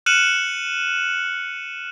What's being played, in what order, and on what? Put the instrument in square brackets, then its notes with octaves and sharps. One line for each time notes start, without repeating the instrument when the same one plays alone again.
[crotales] F6 F#6 C#7 D#7 E7 F#7